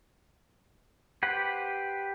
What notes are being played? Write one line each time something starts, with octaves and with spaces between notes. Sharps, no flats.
G4 B4 C5 F#5